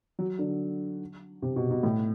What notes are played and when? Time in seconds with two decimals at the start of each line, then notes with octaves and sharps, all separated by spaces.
0.19 F#3
0.39 D3
1.42 C3
1.56 B2
1.70 B2
1.83 A2